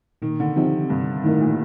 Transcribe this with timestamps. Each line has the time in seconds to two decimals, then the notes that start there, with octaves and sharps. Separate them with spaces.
0.22 A#2 D#3
0.40 D3
0.56 C3 F3 C4 D#4 G4
0.90 G2 C3
1.24 A2 D#3 A3 D#4 A#4
1.41 A#2